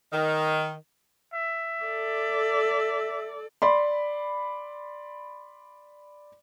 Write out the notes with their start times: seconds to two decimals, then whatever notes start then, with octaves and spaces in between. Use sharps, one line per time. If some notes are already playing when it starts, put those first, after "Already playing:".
0.13 D#3
1.34 E5
1.85 A4 D5
3.62 D5 B5 C6